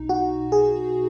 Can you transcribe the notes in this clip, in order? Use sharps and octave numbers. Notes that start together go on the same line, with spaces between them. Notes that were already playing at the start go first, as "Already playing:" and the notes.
Already playing: B1 B2 D#4
F#4
G#4